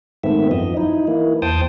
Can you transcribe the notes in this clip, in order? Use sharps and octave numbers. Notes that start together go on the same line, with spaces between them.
G#2 D#3 A3 B3 C4 E5
F#2 F3 D#5
D#4 E4
E3 A#3 E4
E2 C5 G5 A5 D#6